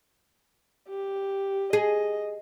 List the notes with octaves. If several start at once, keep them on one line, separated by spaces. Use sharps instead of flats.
G4
G#4 D#5